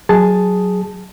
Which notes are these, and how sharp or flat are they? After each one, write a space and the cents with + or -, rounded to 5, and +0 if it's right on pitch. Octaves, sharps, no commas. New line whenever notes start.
F#3 +0 G#4 +0 A5 +0